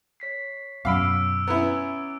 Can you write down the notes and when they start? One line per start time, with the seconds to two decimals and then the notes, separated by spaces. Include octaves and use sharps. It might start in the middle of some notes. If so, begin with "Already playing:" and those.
0.20 C#5 B6 C7
0.85 F#2 B2 F5 B5 D6 E6 D7
1.47 B3 C#4 E4 A#5